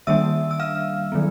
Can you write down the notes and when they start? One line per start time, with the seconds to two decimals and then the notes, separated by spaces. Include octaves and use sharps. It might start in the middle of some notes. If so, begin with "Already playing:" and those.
0.07 D#3 G3 A#3 D4 E5 E6
0.51 E6
0.60 F5 F6
1.12 D#3 F#3 B3